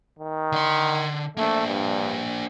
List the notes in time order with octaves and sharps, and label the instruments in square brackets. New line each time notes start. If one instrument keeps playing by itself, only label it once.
[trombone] D#3
[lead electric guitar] D3 C6
[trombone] A3 [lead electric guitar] A#3 D4
[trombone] G2